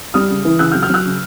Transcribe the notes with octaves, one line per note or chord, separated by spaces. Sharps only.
G3 D#6 F6
C#3
E3
C#3 E6 F#6
F6 G6
F#3
F6 G6
F#3 E6 F#6
C#3